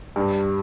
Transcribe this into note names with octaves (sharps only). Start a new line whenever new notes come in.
G2